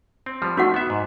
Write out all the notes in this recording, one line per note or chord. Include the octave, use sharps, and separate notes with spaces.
C4
F3 G3
A3 D#4 F#4 F#5
B3 E5
G#2